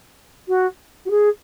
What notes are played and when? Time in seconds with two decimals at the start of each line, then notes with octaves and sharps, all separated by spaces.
0.48 F#4
1.06 F#4
1.10 G#4